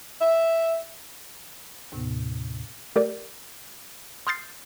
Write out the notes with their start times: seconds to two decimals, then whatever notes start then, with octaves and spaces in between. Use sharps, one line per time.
0.22 E5
1.92 D#2 A2 C3 B3
2.96 A3 G4 A#4 D5
4.27 C6 D#6 F6 G6 A6 C7